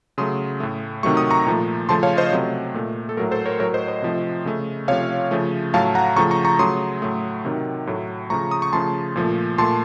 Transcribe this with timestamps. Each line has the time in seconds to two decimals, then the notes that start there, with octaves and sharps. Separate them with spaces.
0.18 C#3 F#3 A3 C6 D#6
0.60 A2 A3
1.03 C3 D#3 F#3 A3 C#6
1.17 D#6
1.30 A#5 C#6
1.47 A#2 F3 A3
1.89 C#3 F3 A3 A5 C6
2.03 C#5 F5
2.17 C5 D#5
2.32 C3 F#3 A3
2.74 A#2 A3
3.09 A4
3.17 A2 F#3 A3 A#4
3.31 A4 C5
3.46 A#4 C#5
3.59 A2 F#3 A3 A#4 C#5
3.74 C5 D#5
3.88 C5 D#5
4.02 C3 F3 A3
4.45 C#3 A3
4.88 C3 F3 A3 C#5 F5
5.31 C#3 F3 A3
5.74 A2 F#3 A3 F5 A5
5.95 F#5 A#5
6.16 C#3 F3 A3 A#5 C#6
6.31 A#5 C#6
6.45 A#5 C#6
6.59 C#3 F#3 A3 C6 D#6
7.02 A2 F#3 A3
7.45 C3 D#3 F#3
7.87 A2 F#3 A3
8.30 C#3 F3 A3 A#5 C#6
8.51 D#6
8.62 C#6
8.73 C#3 F3 A3 A5 C6
9.16 A#2 F3 A3
9.58 A#2 A3 A5 C6